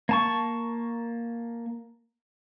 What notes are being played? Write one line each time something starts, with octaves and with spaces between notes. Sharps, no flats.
A#3 A5 C#6